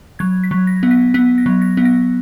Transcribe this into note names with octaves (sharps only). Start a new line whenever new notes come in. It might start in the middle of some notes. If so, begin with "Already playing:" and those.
F#3 G#6
B6
F#3
A#6
B3
B6
B3 B6
A#6
F#3
A#6
B3
A#6